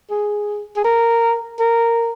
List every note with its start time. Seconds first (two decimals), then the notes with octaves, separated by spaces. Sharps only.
0.10 G#4
0.76 G#4
0.84 A#4
1.59 A#4